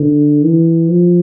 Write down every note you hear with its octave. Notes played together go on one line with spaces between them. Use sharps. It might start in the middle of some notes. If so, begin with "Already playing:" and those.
Already playing: D3
E3
F3